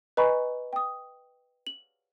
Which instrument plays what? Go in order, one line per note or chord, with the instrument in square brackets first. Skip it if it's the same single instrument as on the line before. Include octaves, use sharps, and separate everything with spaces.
[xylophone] B4 D#5 G#5 A#5 B5 C#6
G5 D#6
F#7